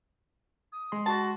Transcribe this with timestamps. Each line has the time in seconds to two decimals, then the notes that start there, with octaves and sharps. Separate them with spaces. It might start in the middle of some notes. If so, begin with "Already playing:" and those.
0.72 D#6
0.92 G#3 C6
1.06 F#4 A5